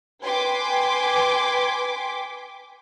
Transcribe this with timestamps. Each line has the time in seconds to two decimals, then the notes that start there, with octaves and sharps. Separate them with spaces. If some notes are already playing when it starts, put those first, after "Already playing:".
0.22 B4 G5 G#5 C6 D6 B6